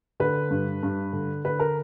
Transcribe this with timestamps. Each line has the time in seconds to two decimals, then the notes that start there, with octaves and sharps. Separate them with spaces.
0.20 D3 B4
0.50 G2
0.83 G2
1.13 D3
1.45 D3 B4
1.60 A#4